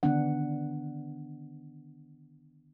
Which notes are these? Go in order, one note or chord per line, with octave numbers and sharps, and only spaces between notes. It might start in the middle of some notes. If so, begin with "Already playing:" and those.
D3 D#3 B3 D4 F#5